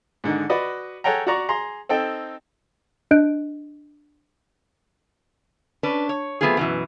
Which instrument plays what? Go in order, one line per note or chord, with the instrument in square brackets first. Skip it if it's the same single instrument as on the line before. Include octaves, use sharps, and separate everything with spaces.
[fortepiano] G#2 D3 D#3
F#4 B4 D5 D#5
G#4 A4 C#5 F#5 G5 A#5
F#4 D5 A#5 C#6
G#4 A#5 C6
C4 D#4 A4 G5
[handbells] D4 D#5 F#6 G6 D7
[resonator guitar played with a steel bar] C#4 D4 B4
C#5
F#3 A3 B3 C4 F4 G#4
F#2 B2 E3